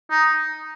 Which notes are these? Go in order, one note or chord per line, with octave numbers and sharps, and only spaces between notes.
D#4